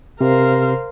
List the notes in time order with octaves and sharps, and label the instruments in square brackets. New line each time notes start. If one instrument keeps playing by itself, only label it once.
[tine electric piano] C3 [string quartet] A#4 C5 F5